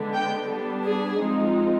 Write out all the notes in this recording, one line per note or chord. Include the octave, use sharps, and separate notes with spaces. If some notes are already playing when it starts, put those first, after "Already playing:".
Already playing: D3 G#3 B3 D4
G5
G3 B3 D4
G#4
F3 G#3 C4 D#4